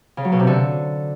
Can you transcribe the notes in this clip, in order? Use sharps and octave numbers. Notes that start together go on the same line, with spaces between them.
C#3
F#3
B2
C3
D3